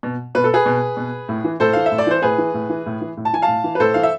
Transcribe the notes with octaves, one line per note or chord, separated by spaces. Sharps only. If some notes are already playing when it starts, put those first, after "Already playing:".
B2
B2 B4
A4
G#4 B4
B2
B2
A2
E3
A2 A4 C5
E3 F5
E5
A2
D5
E3 C5
A2 G#4 B4
E3
A2
E3
A2
E3
A2
A5
E3 G#5
F5 A5
A2
E3
B4
A2 A4 C5
E3 F5
E5